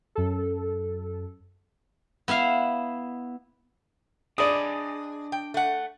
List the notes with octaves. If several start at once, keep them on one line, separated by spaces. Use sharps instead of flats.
F#2 A4
B3 E4 E5 F5
D4 G#4 D5 D#5 B5 D#6
G5
A3 F#5